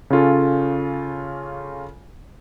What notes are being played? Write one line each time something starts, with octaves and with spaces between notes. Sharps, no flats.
C#3 C#4 F4 A4